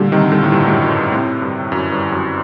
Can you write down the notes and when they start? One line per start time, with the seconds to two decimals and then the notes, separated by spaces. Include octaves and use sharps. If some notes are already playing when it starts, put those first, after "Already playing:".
Already playing: A#2 D3 G3 A#3 D4 G4
0.12 C3 D#3
0.32 A#2 D3
0.43 A2
0.52 G2 A#2
0.67 F#2 A2
0.82 F#2
0.97 G2
1.12 A2 C3
1.42 G2
1.72 F#2
1.92 G2
2.12 F#2